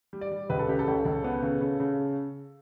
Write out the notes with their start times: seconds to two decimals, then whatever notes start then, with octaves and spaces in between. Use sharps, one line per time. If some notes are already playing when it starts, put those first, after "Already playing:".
0.13 G3
0.21 D5
0.32 G3
0.50 C#2 B4
0.59 A4
0.68 C#3 G4
0.79 A4
0.88 C#2
1.05 C#2
1.24 B3
1.43 C#3
1.61 C#3
1.80 C#3